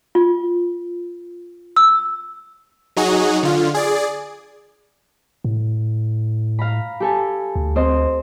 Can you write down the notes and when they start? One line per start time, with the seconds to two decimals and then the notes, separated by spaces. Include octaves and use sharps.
0.15 F4
1.76 E6
2.97 F#3 D#4 F#4 G#4
3.43 D3 F4
3.74 G#4 D5
5.45 A2
6.59 F5 A#5 B5
7.00 G4 A4 G#5
7.56 D2
7.76 C4 C5 D#5